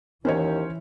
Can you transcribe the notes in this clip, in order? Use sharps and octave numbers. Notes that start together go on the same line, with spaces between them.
D#2 E3 C#4 C5 C#5